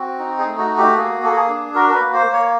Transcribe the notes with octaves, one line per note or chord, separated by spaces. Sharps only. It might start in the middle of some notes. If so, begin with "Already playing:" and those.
Already playing: C4 F#4
D#4
G#4
A3
F#4
F#4
G4
A#3 G#4
A#3 A4
G#4
D4
F#4 A#4
A#4
B4
A#3
C5
A#3
C#5